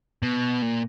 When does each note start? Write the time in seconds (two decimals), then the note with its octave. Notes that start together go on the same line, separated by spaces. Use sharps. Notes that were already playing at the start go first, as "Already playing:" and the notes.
0.23 B2
0.62 A#2